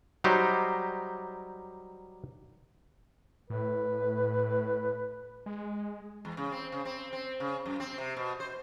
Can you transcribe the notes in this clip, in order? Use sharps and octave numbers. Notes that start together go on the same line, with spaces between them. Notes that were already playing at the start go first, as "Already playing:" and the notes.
F#3 G3 D#4 G4 C5
A2 B4
G#3
E2
C#3
C4
C#3
C4
C4
C#3
F#2
C4
C3
B2
C5